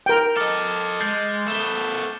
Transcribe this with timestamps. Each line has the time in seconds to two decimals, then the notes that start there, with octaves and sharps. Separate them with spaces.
0.06 A#4 G5
0.37 A4 D#5 D6 F6 A6
1.01 G#3 G6 A6 C7
1.48 A3 B3 E7 G7